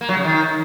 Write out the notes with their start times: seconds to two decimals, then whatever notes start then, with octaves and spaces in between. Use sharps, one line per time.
0.01 A#3
0.09 F#3
0.17 C#3
0.25 D#3